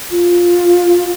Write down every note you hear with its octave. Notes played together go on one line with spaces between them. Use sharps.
F4